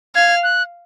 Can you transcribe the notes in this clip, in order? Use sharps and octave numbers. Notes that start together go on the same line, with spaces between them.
F5 G#6
F#6